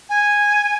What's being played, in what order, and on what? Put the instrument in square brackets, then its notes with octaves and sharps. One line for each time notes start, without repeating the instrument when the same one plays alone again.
[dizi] G#5